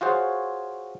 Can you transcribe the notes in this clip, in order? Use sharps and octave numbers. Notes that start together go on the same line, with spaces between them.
F4 F#4 G#4 C5 C#5